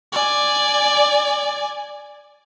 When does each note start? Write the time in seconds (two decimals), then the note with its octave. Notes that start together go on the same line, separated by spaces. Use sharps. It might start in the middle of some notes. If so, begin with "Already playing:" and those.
0.12 D5 G#5